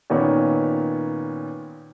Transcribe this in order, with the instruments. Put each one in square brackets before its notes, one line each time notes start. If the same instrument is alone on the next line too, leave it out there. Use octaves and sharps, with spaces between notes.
[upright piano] A#2 D#3 B3 C#4 D#4